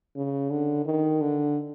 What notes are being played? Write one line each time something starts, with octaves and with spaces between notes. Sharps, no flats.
C#3
D3
D#3
D3